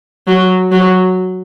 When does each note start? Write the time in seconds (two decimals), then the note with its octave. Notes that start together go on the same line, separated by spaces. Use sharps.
0.27 F#3
0.72 F#3